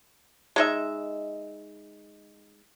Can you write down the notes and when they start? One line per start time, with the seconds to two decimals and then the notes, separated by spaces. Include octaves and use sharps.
0.56 G#3 D#4 E5